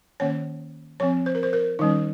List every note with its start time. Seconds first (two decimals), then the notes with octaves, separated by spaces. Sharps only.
0.20 D#3 A#3 C#4 C#5
1.00 F3 C4 C#5
1.26 C5
1.35 A#4
1.43 C5
1.53 A#4
1.79 D#3 G3 C#4 D#4